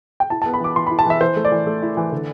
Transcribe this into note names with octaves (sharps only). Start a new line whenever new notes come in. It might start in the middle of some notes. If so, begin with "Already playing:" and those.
G5
E4 A5
A5
B3
B5
E3 D6
E3 C6
B5
E4
A5
E3 E5
E3 C5
A3
D5
E3
A3
E4
E3
D3